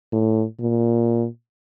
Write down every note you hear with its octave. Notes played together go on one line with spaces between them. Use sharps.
A2
A#2